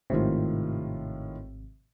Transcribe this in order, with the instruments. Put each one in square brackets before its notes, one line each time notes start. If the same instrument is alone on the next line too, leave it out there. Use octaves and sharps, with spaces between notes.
[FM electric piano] G#1 C3 [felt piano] A2 D#3 F4